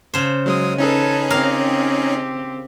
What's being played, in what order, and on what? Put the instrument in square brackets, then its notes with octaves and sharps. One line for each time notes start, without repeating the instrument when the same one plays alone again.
[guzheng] C#3 C5
[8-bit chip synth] F#3 G#3 D#6
[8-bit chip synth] C#4 D#4 G#4 [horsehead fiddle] A4 B4
[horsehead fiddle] C4 G4 [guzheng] A#4 F5